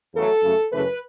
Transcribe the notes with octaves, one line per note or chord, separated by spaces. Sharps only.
E2 C#3 F#3 A3 A4
F#2 C#3 A3
F#2 C#3 E3 A3 B4